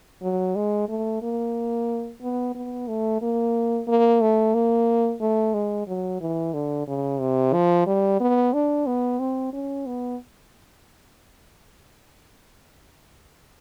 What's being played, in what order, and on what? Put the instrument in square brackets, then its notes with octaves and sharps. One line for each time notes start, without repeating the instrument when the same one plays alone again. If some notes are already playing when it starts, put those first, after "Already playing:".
[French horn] F#3
G#3
A3
A#3
B3
B3
A3
A#3
A#3
A3
A#3
A3
G#3
F#3
E3
D3
C#3
C3
F3
G3
B3
D4
B3
C4
C#4
B3